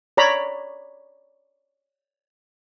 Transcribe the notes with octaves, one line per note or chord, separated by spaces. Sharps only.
C#5 D5 A#5 B5